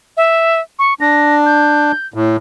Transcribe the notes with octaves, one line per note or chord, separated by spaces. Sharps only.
E5
C#6
D4 A#6
G6
A2